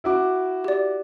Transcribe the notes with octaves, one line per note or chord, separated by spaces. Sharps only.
E4 F#4 D6
G4 D5